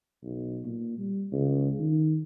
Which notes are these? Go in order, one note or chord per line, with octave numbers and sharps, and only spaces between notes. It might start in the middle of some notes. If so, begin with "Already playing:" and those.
B1
A#2
G3
C#2
D#3